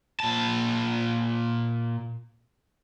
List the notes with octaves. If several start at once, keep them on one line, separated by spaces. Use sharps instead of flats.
A#2 A5